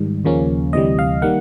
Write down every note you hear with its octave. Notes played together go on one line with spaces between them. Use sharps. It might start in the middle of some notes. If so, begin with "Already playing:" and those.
Already playing: G#2 D#3 G3
D#2 C#3 F3 A#3 C#4
D2 C3 E3 G3 D#5
F5
D#3 G3 A#3 F#5